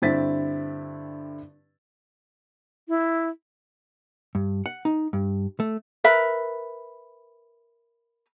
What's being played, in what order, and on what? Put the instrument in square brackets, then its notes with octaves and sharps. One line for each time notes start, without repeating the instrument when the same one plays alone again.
[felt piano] G2 D3 C4 E4 A6 B6
[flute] E4
[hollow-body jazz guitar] G2
F#5
D#4
G2
A3
[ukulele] A#4 B4 E5